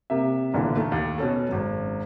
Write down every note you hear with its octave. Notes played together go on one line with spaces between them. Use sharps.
C3 A#3 E5
B1 A#2 D3 E3
D#3 A3 A#3
D#2
B2 C#4 A4
G#1 F#2